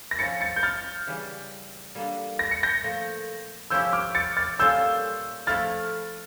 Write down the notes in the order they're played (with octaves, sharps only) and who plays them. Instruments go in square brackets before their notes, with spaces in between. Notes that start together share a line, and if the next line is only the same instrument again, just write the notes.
[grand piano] A#6
[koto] F3 C#4 E4 [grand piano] A6 C#7
[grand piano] A6 C#7
G6
F6 A6
[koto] C#3 E3 G3
G3 A#3 D4 A4
[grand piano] A#6
C#7
G6 A#6
[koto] A#2 F3 A3
[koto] F3 C#4 E4 G4 [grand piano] E6 G6
[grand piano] E6
D6 F6
A6 C#7
F6 A6
[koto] A#2 G3 C#4 F4 A4 [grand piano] E6 G6
[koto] F3 A3 E4 A4 [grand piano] F6 A6